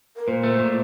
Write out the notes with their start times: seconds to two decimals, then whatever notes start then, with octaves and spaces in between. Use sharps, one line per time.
0.16 A#4
0.28 A#2 C5
0.44 A3
0.59 A#2